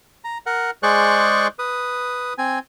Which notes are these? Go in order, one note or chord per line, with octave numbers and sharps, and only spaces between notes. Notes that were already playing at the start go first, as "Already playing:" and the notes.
A#5
A#4 F#5
G#3 G#4 C5 D5 C#6 F#6
B4 D#6
C4 G#5